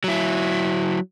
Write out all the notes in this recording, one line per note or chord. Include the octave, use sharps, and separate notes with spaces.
F#3 E4